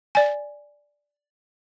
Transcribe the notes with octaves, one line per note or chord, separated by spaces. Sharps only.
D5 G#5